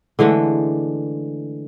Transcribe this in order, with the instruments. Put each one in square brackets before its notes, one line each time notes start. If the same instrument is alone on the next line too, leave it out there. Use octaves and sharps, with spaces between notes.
[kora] D3 E3 G#3 A3